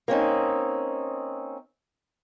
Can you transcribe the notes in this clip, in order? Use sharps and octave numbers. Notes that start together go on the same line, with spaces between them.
A#3 C4 C#4 D#4